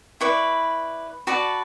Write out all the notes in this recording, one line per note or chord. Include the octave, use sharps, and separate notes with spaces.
E4 B4 D5 C#6
F#4 B4 D5 A5